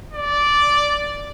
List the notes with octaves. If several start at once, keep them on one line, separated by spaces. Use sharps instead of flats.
D5